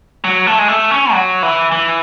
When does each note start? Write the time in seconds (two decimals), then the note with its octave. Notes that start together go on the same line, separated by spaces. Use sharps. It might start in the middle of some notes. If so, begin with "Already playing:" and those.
0.24 F#3
0.47 A3
0.59 G#3
0.68 A3
0.91 C#4
1.13 F#3
1.43 E3
1.72 E3